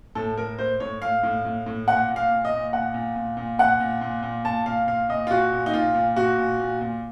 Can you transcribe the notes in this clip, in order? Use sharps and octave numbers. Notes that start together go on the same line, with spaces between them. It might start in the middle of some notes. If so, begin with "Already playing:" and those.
A2 A4
A2 A#4
A2 C5
A2 C#5
A2 F5
A2
A2
A2
A#2 F#5
A#2
F5
A#2
D#5
A#2
A#2 F#5
A#2
A#2
A#2
A#2 F#5
A#2
A#2
A#2
A#2 A5
A#2 F5
A#2 F5
A#2 D#5
F4
A#2 F#4
A#2
D#4
A#2 F4
A#2
A#2 F#4
A#2
A#2
A#2